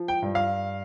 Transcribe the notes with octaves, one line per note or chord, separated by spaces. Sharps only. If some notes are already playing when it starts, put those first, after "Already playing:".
Already playing: F3
G5
G2
F5